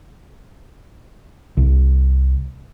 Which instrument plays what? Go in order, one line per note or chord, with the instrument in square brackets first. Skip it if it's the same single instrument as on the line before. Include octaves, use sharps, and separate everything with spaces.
[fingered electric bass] C2